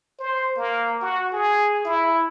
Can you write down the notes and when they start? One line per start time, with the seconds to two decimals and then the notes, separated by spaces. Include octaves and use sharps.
0.19 C5
0.56 A#3
1.01 F#4
1.32 G#4
1.84 E4